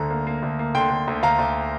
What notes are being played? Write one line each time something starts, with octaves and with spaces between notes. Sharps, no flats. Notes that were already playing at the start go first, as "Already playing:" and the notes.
Already playing: D2 D3 A#5
A#3
A#3
D2
A#3
D3 G5 C6
D3
D2
D2 F5 A#5
D2